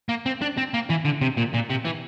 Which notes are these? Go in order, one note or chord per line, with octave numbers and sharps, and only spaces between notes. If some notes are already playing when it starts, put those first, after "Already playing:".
A#3
C4
D4
C4
A#3
E3
D3
C3
A#2
A#2
C3
E3